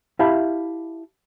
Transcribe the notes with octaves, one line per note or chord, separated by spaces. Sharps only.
E4 G4 E5 F5 A5 B5